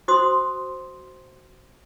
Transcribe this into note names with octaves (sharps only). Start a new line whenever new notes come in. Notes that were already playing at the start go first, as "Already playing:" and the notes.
F#4 C5 C6 D#6